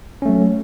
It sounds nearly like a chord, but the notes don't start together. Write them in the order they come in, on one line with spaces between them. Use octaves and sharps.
C#4 A3 F#3